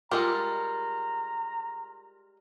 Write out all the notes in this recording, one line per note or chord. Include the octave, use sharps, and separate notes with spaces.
G3 G#3 F4 A4 A#4 A#5 C6 F6